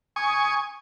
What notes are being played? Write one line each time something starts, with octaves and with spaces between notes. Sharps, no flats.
G#5 C#6 D#6